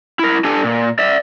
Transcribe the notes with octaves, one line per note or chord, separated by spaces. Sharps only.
E4 A#4
D4 G4 A4 G#5
A#2
D5 E5